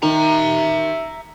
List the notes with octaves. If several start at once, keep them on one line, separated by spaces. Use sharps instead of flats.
D#3 E5 A#5